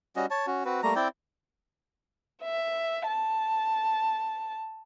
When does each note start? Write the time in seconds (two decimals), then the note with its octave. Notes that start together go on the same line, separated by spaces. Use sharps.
0.16 G3 C#4 F#4 D#5
0.31 C#5 A5
0.47 C#4 F#4
0.65 C4 F#4 B4
0.83 G3 A3 A#3 A#5
0.96 C4 E4 D5 G5
2.43 E5
3.07 A5